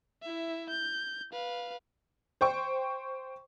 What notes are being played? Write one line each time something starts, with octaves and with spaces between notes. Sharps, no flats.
E4 E5
G6
B4 F5
C5 G5 C#6